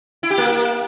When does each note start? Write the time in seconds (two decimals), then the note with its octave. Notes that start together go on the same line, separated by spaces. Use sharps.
0.23 E4
0.30 G4
0.38 A#3